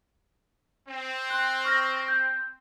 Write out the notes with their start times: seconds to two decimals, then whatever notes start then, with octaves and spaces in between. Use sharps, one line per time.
0.88 C4
1.30 C6 F#6
1.64 C#6 F6 A#6
2.08 G6